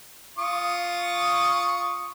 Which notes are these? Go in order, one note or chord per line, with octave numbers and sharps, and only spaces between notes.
F4 C#6 D#6